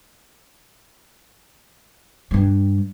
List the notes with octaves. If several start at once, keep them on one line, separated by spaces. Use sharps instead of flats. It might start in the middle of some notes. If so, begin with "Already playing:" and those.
G2 G3